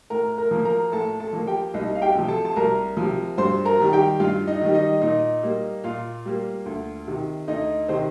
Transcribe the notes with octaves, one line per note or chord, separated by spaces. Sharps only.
A2 A#4 A#5
A#4 A#5
F3 A#3
A#4 A#5
A2 A4 A5
A4 A5
F3 A#3
G4 G5
C2 D#4 D#5
F5
G4 G5
C3 F3
A4 A5
A5
C2 A#4 A#5
C3 F3
G2 C5 C6
A#4 A#5
D#3 G3
G4 G5
G2 F4 F5
D#4 D#5
D#3 G3
D#4 D#5
A#2 D#4 D#5
G3 A#3
A#2 F4 F5
G3 A#3
D2
C3 D#3
D2 D#4 D#5
C3 D#3 C5